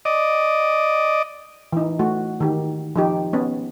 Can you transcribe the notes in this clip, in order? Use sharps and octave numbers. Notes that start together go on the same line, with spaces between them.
D5 D#5
E3 D#4
A3 F#4
D#3 G4
F3 D#4 G4
B3 C#4